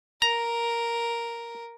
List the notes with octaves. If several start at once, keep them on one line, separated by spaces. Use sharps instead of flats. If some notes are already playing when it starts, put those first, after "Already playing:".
A#4 A#5